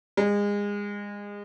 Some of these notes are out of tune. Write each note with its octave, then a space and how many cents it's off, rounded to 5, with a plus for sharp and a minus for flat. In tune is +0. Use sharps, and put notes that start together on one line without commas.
G#3 -30